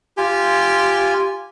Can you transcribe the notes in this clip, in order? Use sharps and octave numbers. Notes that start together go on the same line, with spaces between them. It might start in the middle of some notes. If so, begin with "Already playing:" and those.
F4 G4 G#5